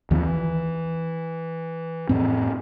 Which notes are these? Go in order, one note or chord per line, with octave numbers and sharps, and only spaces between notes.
D#2 D#3 F3 C4
E3
F2 A2 C4